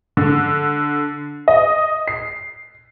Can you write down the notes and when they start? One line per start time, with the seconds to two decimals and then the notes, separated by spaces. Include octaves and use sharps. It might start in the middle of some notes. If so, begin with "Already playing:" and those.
0.17 D3
1.48 D#5
2.08 C7